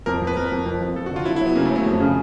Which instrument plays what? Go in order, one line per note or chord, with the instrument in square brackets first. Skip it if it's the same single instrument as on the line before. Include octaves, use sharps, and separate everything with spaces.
[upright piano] F2 [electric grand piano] A#4
[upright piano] F2
[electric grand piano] B4
[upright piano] F2 [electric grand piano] A#4
[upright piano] F2
F2
F3
[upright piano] F2 [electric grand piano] A4
[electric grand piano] F#4
[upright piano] D3
[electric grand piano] F4
[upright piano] F#3 [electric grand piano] E4
[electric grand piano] E4
[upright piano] F#3 [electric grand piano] B3
[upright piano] C#3 [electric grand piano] A#3
[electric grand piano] A3
[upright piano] F#3
[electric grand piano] A3
[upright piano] F2
C#3